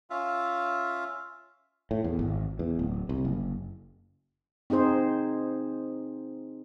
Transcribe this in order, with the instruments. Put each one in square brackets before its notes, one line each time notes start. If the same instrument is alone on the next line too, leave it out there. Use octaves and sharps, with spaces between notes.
[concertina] C#4 F4 E5 F5
[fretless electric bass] A2
E2
G#1
E2
D1
C2
F#1
[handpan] C4 D#4 G#4 C5